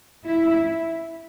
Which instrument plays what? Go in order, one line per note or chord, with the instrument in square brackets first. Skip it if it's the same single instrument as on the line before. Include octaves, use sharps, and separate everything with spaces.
[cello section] E4